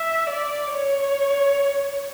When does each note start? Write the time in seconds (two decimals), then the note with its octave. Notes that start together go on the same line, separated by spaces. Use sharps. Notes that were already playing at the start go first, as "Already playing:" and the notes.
Already playing: E5
0.27 D5
0.71 C#5